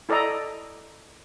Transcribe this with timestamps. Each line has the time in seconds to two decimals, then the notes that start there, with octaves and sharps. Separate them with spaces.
0.09 E4 A4 D5 D#5 A#5